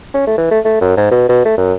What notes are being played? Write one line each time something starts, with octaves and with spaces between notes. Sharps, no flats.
C#4
A3
E3
A3
A3
F#2
G#2
B2
B2
A3
F#2